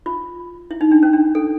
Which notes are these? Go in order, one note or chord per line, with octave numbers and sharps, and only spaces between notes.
F4
E4
D#4
D4
C#4
D4
A4